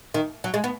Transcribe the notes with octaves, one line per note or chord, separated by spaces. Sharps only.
D#3
F#3
G#3
B3